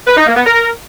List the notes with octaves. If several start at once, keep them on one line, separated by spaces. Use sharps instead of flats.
B4
D#4
A#3
B3
A#4